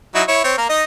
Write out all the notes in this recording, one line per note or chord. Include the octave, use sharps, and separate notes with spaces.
F#3 D#4 E4
E4 C#5
C4 C#5
A#3 A#4
D#4 D#5